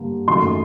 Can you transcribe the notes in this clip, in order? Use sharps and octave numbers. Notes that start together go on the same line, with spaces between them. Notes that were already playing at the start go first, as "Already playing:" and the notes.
Already playing: G2 D3 A#3
F#2 D#3 A3 C6